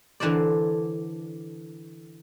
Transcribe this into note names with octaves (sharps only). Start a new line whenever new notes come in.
D3 E3 A#4 C5 D5